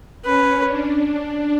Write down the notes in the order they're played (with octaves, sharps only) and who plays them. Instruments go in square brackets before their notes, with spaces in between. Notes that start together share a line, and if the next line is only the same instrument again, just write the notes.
[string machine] C#4 [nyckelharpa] B4
[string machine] D4